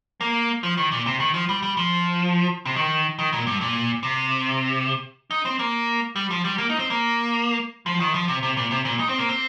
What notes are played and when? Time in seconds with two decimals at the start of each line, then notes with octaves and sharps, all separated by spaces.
0.21 A#3
0.63 F3
0.77 D#3
0.92 A#2
1.06 C3
1.20 D#3
1.34 F3
1.49 G3
1.62 G3
1.77 F3
2.66 C3
2.76 D#3
3.19 D#3
3.33 A#2
3.47 G2
3.61 A#2
4.03 C3
5.31 D#4
5.45 C4
5.59 A#3
6.16 G3
6.31 F3
6.44 G3
6.58 A#3
6.70 D#4
6.79 C4
6.90 A#3
7.86 F3
8.00 D#3
8.14 F3
8.28 C3
8.43 C3
8.57 A#2
8.71 C3
8.85 A#2
8.99 D#4
9.09 C4
9.19 A#3
9.29 C4